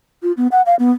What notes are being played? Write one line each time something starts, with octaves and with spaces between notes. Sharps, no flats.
F4
B3
F#5
F5
B3